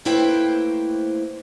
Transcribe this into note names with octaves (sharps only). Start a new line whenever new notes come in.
A3 A#3 E4 B4 C5 G5